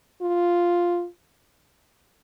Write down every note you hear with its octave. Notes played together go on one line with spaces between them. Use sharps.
F4